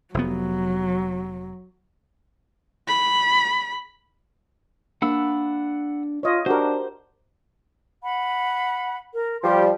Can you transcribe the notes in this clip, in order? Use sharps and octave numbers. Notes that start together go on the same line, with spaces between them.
F1 F#3 B3
B5
A#3 D4 F5 F#5 B5 E6
F4 C#5 D#5
D4 F#4 G4 A#4 C5
F#5 B5
A#4
F3 G3 G4 C6